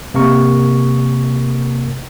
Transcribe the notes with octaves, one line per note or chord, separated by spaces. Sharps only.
C3 A#3 A#4 C#6